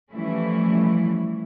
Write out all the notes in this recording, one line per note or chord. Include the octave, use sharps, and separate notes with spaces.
E3 F3 G3 A3 C#4 E4